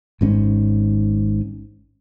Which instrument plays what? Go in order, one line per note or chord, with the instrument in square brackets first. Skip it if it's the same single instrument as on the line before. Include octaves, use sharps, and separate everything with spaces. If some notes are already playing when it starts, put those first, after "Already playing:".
[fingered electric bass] G#1 G#2 C#4